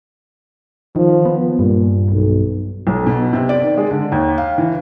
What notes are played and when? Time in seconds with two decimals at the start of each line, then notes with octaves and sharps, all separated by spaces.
0.96 D#3 F3
1.26 B3
1.59 G2 A#2
2.11 B1
2.87 B1
3.07 B2
3.33 C3
3.49 D5
3.62 D#3
3.77 G#3
3.91 D3
4.12 D#2
4.38 F5
4.58 E3